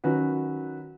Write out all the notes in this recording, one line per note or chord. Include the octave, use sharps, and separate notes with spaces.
D#3 F#3 C#4 F#4 B4